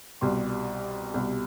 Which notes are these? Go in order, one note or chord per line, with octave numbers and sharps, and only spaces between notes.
C2 B2 G3 C6
C2 B2 G3